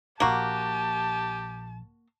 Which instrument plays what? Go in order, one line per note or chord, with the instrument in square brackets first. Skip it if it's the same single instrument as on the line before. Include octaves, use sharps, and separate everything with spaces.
[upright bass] A#1 A#2 [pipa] A#3 F#4 [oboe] G4 [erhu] A5